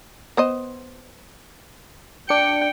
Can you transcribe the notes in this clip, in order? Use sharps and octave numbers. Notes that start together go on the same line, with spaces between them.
B3 C5 D#5
D4 G5 C#7